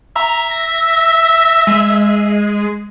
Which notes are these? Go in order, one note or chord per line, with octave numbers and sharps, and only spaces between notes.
E5 A#5
A#6
G#3